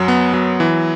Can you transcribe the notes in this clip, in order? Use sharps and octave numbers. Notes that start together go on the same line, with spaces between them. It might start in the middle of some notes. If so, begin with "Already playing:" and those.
Already playing: F#2 F#3
B3
F#3
E3